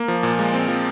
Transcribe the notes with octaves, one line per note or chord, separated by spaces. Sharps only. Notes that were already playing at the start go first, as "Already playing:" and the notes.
Already playing: A#3
F3
A#2
G#3
C4
F3